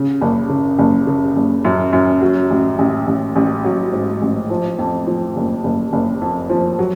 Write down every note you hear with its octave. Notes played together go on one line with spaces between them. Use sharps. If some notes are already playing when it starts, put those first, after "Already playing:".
Already playing: C#3
F#1
C#3
F#1
C#3
F#1
F#2
F#2
F#3
A1
A1
A1
A1
F#3
G#2
A1
F3
F2
F3
F#1
F#1
F#1
F2
F3
F#3